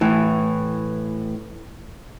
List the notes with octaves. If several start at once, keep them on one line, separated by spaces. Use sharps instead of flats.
A2 E3